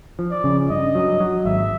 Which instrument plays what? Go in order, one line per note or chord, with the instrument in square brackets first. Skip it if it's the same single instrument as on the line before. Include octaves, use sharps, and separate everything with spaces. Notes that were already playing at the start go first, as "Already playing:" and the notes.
[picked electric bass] F3
[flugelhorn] D5
[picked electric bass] C#3
[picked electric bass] G2 [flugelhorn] D#5
[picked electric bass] F#3
F#3
[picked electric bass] G#1 [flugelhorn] E5